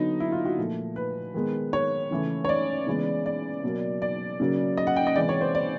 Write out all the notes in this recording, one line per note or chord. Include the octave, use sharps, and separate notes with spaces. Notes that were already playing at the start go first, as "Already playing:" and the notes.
Already playing: D3 F#3 B3 D#4
E4
F4
F#4
A#2 F3 A3
B4
D#3 G#3 B3
C#5
C#3 E3 A3
C#5
D5
C#3 E3 G#3 B3
D5
B2 F#3 A#3
D5
C#3 F#3 A#3
D#5
F#5
G5
D#5
C3 E3 G#3 D5
C#5
C5
D5